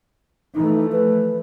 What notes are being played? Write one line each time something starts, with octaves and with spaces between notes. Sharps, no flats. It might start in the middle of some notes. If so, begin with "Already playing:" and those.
E3 F3 A3 D#4
B4